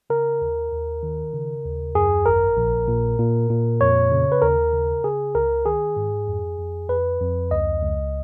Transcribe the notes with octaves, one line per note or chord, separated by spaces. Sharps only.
C#3 A#4
D#2
D#2
D#3
C#3
D#2
F#2 G#4
G#1 A#4
A#1
A#2
A#2
A#2
F2 C#5
C#3
B4
D#2 A#4
C#3
C#3 G#4
C#2 A#4
D#3 G#4
G#2
F2
F2
F2 B4
F2
C#2 D#5
C#2